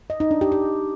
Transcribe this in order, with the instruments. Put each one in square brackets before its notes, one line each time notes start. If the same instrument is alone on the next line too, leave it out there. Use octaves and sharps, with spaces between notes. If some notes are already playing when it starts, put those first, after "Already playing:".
[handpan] D#5
D#4
D4
G4
G4